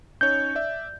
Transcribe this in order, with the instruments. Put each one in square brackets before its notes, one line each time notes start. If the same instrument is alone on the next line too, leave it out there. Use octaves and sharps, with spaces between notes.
[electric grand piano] C#4 D#4 C#5 [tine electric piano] G6
[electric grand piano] D5 E5